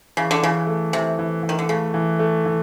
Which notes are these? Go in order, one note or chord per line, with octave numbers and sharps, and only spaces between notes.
C#3 E3
D3
C#3 E3
A3
C3 E3
E3
E3
D#3
D3
C#3 A3
E3
A3
E3